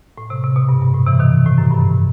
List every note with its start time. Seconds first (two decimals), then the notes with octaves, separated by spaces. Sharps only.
0.18 A2
0.30 C3
0.44 C3
0.56 B2
0.69 G2
0.82 G2
0.94 A2
1.07 C3 E3
1.19 B2 D#3
1.46 A2
1.58 F#2
1.70 G2